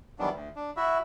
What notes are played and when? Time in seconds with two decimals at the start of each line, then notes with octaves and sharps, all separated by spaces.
0.19 D#3 E3 F#3 G3 B3 D4
0.32 D2
0.56 D4
0.76 E4 F#4 E5